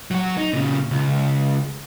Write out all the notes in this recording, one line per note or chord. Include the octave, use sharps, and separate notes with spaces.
F#3 F#4
D#4
A#2 C#3
C#2